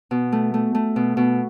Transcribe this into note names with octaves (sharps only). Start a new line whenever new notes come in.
B2
A3
A3
A3
B2
B2